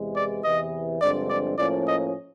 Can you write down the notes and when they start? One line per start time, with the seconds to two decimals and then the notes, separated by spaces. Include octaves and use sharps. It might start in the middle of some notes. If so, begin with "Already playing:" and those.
Already playing: E2 C3 E3 G#3
0.16 D5
0.44 E2 C3 E3 D#5
1.01 G2 D3 F3 G#3 C4 D5
1.30 D5
1.58 A2 F3 A#3 C#4 D5
1.87 D#5